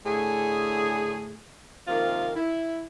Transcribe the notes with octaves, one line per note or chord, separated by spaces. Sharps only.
A2 D3 A3 G#4
C3 D#3 F3 A#3 F4 A#4
E4